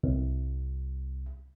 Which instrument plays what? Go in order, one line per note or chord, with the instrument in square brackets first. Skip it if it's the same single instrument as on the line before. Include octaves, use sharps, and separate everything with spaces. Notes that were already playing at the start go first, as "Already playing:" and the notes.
[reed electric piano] C2